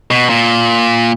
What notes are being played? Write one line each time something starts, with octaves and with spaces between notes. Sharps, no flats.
B2
A#2